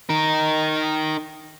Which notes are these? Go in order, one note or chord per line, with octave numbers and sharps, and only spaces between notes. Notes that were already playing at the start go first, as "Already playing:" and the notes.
D#4 A#4